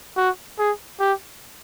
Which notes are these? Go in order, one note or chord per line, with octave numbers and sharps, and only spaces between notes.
F#4
G#4
G4